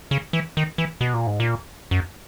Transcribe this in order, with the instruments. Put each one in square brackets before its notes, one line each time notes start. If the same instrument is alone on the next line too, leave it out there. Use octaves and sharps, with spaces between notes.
[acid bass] C#3
E3
D#3
E3
B2
A#2
G#2
A#2
F#2